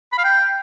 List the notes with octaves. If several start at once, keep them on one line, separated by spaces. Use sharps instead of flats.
B5
F5
G5